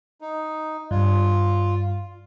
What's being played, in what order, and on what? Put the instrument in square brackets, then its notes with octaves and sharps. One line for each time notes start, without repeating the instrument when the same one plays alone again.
[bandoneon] D#4
[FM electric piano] G2 [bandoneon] F4